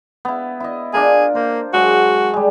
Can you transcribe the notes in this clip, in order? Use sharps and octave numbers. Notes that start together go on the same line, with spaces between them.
B3 E4
E4 D#5
D4 F4 G#4 A#4
A#3 C5
F#3 G#3 F#4
G3 G#3